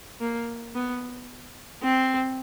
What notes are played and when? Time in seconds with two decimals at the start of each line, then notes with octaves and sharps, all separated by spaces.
0.21 A#3
0.75 B3
1.83 C4